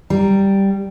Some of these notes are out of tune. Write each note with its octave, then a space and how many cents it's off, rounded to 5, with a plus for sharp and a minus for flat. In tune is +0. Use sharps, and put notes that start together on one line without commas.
G3 +0 A#5 +0